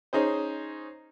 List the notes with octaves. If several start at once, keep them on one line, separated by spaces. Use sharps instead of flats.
C#4 D#4 G#4 C5